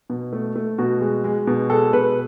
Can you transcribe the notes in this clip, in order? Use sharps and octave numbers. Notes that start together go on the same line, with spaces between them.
B2
A3
A3
B2 F#4
G#3
G#3
B2
G#3 A4
B2 B4